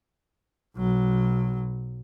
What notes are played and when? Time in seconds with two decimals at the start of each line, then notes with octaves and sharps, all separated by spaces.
0.76 B1 F#3